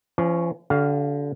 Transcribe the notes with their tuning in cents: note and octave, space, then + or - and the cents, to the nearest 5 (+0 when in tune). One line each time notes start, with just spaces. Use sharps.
F3 -40 C#4 +0
D3 -25 F#4 +35 F5 +0